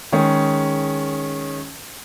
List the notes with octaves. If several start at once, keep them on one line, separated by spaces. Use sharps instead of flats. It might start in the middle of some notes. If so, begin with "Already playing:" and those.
D#3 G#3 C#4 G#4